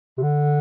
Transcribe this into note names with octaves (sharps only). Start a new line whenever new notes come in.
C3
D3